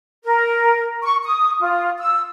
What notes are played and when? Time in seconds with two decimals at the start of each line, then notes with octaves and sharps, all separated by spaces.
0.24 A#4
1.03 C#6
1.24 D#6
1.61 F4
1.99 E6